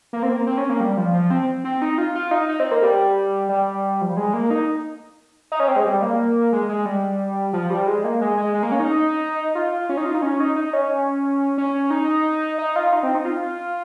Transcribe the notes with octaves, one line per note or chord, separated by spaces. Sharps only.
A#3
C4
A#3
C4
C#4
A#3
G3
F3
F3
C4
C4
D#4
F4
F4
D#4
D#4
C4
A#3
G3
G3
F3
G3
G#3
A#3
D#4
D#4
C#4
C4
G#3
G3
A#3
G#3
G#3
G3
F3
G3
G#3
A#3
G#3
G#3
G#3
A#3
C#4
D#4
F4
C#4
D#4
F4
D#4
C#4
D#4
D#4
C#4
C#4
D#4
D#4
F4
D#4
C4
D#4
F4